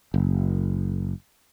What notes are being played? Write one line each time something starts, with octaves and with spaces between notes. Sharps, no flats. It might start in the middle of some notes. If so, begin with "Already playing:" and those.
F#1